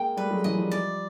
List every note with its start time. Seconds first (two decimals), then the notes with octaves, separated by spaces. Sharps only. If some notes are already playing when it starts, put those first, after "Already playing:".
Already playing: G#3 A#3 G5
0.17 G3 A3 B4
0.30 F#3 G#3
0.44 E3 F#3 D#5
0.58 F3 G3
0.72 D5